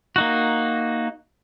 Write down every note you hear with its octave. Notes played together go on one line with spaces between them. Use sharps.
A#3 D#4 F#4